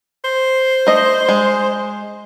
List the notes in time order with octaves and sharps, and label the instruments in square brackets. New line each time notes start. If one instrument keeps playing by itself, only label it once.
[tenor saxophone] C5
[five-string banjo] A3 D#5
G#3